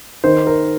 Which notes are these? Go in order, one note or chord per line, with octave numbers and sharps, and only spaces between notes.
D#3 C5
A#4